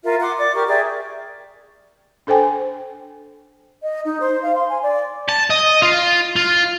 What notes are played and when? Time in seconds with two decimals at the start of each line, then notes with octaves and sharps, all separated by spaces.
0.03 F4 A#4 E5
0.21 F#5 C6 D6
0.37 D5 D6
0.53 G4 A#4 C#6 F6
0.67 G#4 D5 E5 G5
2.27 D4 A4 C5 G5 G#5
3.83 D#5
4.05 D#4
4.20 C5
4.43 F5
4.55 C6
4.69 G#5
4.83 D5
5.29 A5
5.50 D#5
5.82 F4
6.36 F4